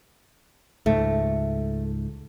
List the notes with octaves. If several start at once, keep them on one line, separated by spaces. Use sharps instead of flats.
C#2 G#2 A3